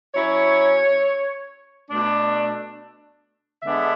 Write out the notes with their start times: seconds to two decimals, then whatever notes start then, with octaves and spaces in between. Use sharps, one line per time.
0.14 F#3 C#4 E4 C#5
1.89 B2 A3 D4
3.63 D3 G#3 B3 D4 E5